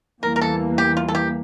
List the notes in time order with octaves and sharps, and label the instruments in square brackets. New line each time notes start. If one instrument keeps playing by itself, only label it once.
[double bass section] E2 E3 G3 A#3 [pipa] A#4
[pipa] A#4
A4
G4
F4
A4
G4